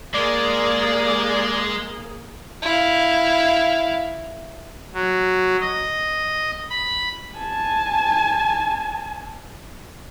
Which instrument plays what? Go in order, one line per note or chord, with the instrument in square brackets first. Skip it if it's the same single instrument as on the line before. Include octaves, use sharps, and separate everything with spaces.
[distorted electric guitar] G#3 [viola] A#3 G#4 [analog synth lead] D5
[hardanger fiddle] E4 F5
[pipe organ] F#3
D#5
B5
[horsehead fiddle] G#5 A5